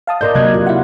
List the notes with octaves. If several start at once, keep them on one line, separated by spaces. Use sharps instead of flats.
F5 A5 D#6
A#4 D5 D#5 A#5 C6 G6
C3 F#3 A#3 D#5 F#6 G#6
F4
E4 F#5